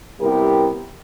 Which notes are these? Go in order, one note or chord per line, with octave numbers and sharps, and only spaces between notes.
C3 G3 B3 E4 G4 A#4